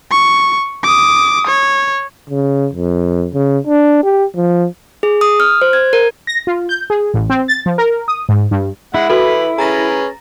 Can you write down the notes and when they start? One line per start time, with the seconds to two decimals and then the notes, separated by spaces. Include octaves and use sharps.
0.11 C#6
0.83 D6 D#6
1.47 C#5
2.30 C#3
2.73 F2
3.34 C#3
3.67 D4
4.03 G4
4.36 F3
5.03 G#4
5.21 D#6
5.40 F6
5.62 C5
5.73 G#6
5.93 A#4
6.27 A#6
6.47 F4
6.69 G6
6.90 G#4
7.14 A1
7.30 C4
7.48 A6
7.66 F3
7.78 A#4
8.08 D#6
8.29 G#2
8.51 G2
8.94 G#3 E4 F#5
9.09 E3 F#4 A4 B4
9.58 C#4 G#4 B4 A#5 A6 A#6